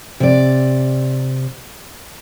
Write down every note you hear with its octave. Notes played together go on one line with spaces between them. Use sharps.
C3 D5